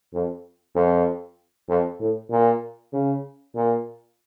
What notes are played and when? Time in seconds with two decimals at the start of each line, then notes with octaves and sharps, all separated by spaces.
0.14 F2
0.75 F2
1.69 F2
2.00 A2
2.31 A#2
2.93 C#3
3.55 A#2